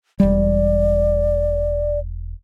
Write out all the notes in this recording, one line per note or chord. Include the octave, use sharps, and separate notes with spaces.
E1 G3 D5